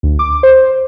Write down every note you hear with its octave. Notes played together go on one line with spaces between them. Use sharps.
D2
D6
C5